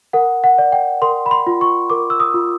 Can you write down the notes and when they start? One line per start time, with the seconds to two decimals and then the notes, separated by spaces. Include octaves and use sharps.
0.13 A#4 F#5
0.44 F#5
0.58 D5
0.72 G5
1.02 A#4 C6
1.26 B5
1.31 C6
1.47 F4
1.61 C#6
1.90 A#4 D6
2.10 E6
2.20 D#6
2.34 F4